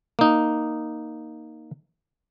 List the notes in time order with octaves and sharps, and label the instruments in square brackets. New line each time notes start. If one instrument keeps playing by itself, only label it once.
[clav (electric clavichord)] A#3 D#4